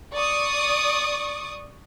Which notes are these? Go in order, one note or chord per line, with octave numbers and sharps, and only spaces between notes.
D5 C#6 D#6